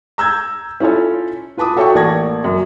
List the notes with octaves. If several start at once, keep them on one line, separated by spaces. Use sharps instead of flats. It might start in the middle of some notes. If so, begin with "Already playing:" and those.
A#5 E6 G6 G#6
C#4 E4 F4 A4 C#5
F4 B4 A5 D6 D#6
F#4 A4 C#5 E5 G5 C#6
A1 A#3 D5 A5 G#6 A#6
F#2